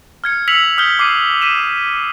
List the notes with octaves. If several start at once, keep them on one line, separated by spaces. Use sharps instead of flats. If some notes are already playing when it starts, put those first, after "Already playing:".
F6 G#6 C#7
E6 B6 C#7 F7 F#7
D#6 F6 G6 G7
D6 F6 C7 D#7
B6 D#7 E7